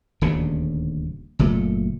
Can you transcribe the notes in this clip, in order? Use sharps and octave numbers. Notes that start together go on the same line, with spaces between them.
D#1 D2 C#3
F#1 A#2 A3